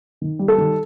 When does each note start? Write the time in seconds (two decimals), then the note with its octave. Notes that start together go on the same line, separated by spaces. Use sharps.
0.21 D#3
0.39 G3
0.48 A4
0.58 D#3